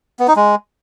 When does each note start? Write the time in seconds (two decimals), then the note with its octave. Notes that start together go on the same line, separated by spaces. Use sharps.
0.19 B3
0.28 D#4
0.36 G#3